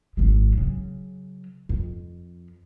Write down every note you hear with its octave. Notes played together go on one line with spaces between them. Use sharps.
G#1 G#3
C#3 F#3
F2